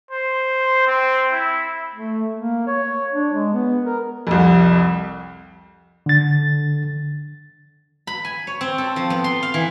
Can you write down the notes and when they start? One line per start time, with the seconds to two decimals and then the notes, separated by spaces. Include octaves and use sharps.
0.11 C5
0.87 C4
1.32 E4
1.94 A3
2.37 A#3
2.67 C#5
3.12 D4
3.33 G#3
3.53 B3
3.84 A#4
4.27 C2 F2
6.06 D3 A6
8.07 B5
8.25 G#5
8.47 C#5
8.61 C4
8.78 A4
8.96 F3
9.10 B3
9.24 C6
9.43 F5
9.54 E3